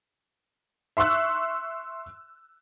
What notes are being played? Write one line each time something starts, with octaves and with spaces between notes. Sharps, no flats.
E5 C6 C#6 E6 F#6